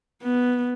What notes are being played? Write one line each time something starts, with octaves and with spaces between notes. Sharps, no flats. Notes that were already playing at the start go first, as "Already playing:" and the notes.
B3